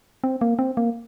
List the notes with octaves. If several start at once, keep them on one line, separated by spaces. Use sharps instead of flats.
C4
A#3
C4
A#3